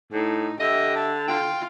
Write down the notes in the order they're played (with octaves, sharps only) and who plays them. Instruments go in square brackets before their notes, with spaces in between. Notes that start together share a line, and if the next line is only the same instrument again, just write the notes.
[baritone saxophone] A2 [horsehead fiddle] D#4
[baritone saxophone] D3 [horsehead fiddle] G4 E5 [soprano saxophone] D#5
[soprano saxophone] A5
[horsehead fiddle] F4 [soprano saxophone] G5